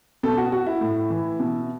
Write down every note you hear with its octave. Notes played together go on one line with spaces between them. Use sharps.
B2 A4
F#4
F#4
E4
A2
E3
B2